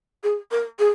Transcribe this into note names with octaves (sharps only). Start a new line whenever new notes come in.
G#4
A#4
G#4